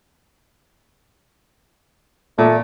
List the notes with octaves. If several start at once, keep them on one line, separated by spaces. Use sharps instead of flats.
A#2 A3